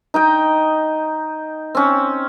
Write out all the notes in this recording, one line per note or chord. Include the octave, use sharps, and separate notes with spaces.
D#4 D#5 G5
C4 C#4